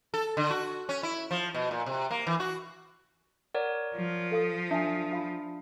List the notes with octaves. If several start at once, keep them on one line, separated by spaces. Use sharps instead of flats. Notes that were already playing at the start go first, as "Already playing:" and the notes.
A4
D3
F#4
C#4
E4
F3
B2
A#2
C3
A#3
E3
F#4
A#4 C#5 D5 F#5
F3
A4 F5 D#6
D4 E5 G#5
F4 F5 B5